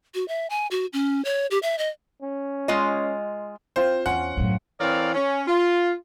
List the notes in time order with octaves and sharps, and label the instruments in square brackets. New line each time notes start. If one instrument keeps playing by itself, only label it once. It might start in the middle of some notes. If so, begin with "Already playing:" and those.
[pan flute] F#4
E5
G#5
F#4
C#4
C#5
G4
E5
D#5
[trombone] C#4
[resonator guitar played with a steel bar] G#3 F4 D#5
[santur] C4 F4 [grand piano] C5
[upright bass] E2 [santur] C#4 C6 [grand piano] F#5
[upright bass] F#2 A2
[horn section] E3 C4 A#4 C#5 D5 F5
C#4
F4